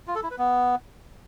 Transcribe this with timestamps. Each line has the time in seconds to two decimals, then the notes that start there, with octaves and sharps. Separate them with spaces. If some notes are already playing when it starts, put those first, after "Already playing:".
0.08 F4
0.15 A4
0.23 E4
0.31 B4
0.38 B3